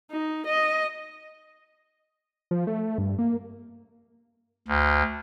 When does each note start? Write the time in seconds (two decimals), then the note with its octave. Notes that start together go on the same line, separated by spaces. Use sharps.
0.10 D#4
0.47 D#5
2.51 F3
2.67 A3
2.98 G2
3.19 A#3
4.68 D2